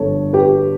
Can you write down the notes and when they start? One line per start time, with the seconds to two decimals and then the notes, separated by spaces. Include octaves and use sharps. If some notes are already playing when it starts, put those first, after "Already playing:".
Already playing: G1 G2 G3 B3 A4 C#5
0.33 G4 B4